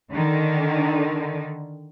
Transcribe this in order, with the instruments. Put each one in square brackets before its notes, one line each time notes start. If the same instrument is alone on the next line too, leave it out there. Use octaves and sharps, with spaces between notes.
[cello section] D3 D#3